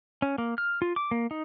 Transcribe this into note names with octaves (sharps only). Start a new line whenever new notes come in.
C#4
A#3
F6
F4
D6
A#3
D#4